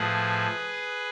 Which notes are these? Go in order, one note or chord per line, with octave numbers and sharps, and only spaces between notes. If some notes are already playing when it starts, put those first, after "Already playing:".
Already playing: A2 F3 G#4 B4